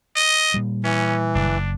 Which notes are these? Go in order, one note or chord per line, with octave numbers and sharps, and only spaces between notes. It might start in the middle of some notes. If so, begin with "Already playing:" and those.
D#5
A#2 G3
E3 C#4
F#1 D4